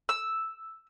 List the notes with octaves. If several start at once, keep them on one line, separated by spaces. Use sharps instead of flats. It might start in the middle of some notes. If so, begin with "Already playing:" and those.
E6